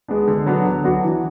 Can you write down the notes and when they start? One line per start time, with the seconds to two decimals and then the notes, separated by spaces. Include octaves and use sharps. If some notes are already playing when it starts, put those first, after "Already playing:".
0.08 G#3 B3 D4
0.28 D3
0.46 F#3 B3 D4 F#4
0.65 D3
0.83 F#3 B3 D4 F#4
1.03 E3